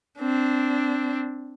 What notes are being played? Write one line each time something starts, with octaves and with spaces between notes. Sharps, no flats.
C4 D4